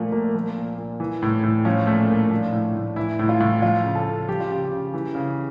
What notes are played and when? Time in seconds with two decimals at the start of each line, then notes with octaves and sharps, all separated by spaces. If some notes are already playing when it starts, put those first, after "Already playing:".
Already playing: A#2 F3 A3 A#3
0.12 A#2 A#3
0.35 F3 A#3
0.56 A#2
0.78 A#2
1.00 E3
1.22 A2
1.43 A2
1.65 F3 C#4
1.87 A#2 A3
2.09 A#2 A#3
2.31 F3 D4
2.52 A2
2.75 A2
2.96 E3 E4
3.19 A2
3.29 F4
3.40 A2
3.62 F3 F4
3.84 C#3
3.95 A4
4.07 C#3
4.29 F3 G4
4.40 F4
4.50 C#3 G4
4.71 C#3
4.94 E3
5.15 C#3